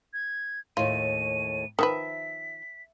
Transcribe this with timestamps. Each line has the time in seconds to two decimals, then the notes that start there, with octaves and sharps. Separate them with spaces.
0.13 G#6
0.77 D#2 A2 F4 D#7
1.79 D#3 F3 B4 E5 B6